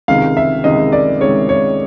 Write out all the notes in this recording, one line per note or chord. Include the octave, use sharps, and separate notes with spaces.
C#2 C3 D#3 G#3 F5
E5
C#2 C3 D#3 G#3 D#5
D5
C#2 C3 D#3 G#3 C#5
C#5